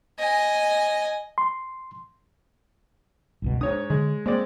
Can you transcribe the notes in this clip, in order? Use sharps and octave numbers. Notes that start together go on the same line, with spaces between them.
D#5 G#5
C6
G1 C#2 B2
G#2 D4 C#5 D#6
D3 G#3
G#3 A#3 C4 D5